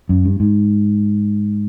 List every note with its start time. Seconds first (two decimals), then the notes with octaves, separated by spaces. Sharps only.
0.09 F#2
0.25 G2
0.40 G#2